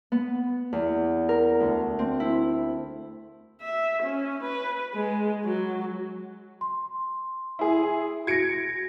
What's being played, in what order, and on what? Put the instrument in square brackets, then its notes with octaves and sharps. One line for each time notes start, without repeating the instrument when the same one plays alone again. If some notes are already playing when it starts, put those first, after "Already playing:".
[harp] B3
E2
A#4
D2
C4
E4
[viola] E5
C#4
B4
G#3
F#3
[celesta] C6
[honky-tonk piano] E4 G#4
[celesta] F#4 A#6 [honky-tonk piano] G#6 C#7 D7